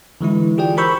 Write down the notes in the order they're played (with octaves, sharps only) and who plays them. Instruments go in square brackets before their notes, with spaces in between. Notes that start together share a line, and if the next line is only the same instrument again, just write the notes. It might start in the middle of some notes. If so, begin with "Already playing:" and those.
[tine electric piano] D3 E3 G#3 E4
F4 G4 G#4 D5 G5
A#4 C5 B5 C#6 E6 G6